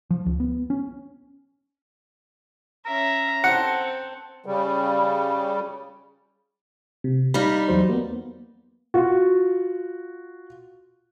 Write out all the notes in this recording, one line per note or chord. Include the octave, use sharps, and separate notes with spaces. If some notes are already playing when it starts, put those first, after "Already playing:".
F3
C#2
B3
C#4
C#4 E5 A#5
C4 A4 F#5 C#7
C#3 G3
C3
G3 D#4 F5 B5
E2 F#3 C5
A#3 B3
F4 F#4